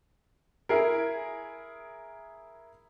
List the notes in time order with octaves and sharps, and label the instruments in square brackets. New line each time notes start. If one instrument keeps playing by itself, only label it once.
[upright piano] E4 G#4 A#4